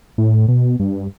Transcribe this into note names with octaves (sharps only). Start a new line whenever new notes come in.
A2
B2
G2